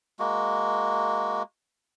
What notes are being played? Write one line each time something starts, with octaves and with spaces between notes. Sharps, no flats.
G#3 A#3 F#4